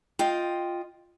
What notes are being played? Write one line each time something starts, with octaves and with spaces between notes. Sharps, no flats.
F4 D#5 G5